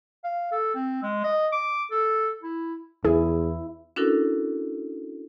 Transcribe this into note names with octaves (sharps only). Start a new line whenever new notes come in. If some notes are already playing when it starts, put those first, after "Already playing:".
F5
A4
C4
G#3
D#5
D6
A4
E4
E2 E4 G#4
C#4 D4 E4 F#4 A4 A#4